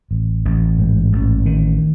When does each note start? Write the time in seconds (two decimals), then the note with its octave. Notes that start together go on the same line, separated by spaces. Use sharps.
0.11 A1
0.45 A1
0.79 G#2
1.13 A1
1.46 D#3